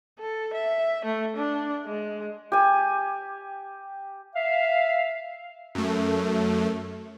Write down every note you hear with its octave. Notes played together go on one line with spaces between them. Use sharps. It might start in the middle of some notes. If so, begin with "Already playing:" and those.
A4
E5
A3
D4
G#3
G4 G#5
E5 F5
F#2 A3